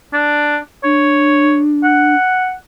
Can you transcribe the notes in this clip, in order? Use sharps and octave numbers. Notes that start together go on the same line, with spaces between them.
D4
D4 C#5
F#5